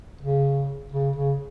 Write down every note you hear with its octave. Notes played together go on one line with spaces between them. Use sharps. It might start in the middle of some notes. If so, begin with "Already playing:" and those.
C#3
C#3
C#3